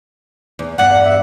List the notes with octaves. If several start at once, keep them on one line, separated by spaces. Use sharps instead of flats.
E2
E2 G2 F#5
E5